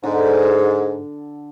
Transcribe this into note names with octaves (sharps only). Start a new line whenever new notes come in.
G#2 D3